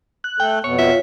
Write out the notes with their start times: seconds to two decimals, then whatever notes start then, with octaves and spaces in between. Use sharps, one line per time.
0.24 F#6
0.40 A3 A4 G5
0.64 F2 B2 B3 C#5
0.79 F4 E5